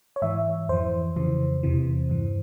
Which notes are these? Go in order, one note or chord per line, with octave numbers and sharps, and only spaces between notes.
C#5
G#2 E3 E5
F2 E3 C5
F2 C#3 E3
E2 C3 E3
G2 E3